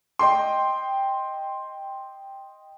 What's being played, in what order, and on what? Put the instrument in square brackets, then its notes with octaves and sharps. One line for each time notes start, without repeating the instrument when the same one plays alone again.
[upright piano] D#5 G5 C6